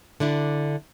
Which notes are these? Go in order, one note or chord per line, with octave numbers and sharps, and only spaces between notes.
D3 D4 E4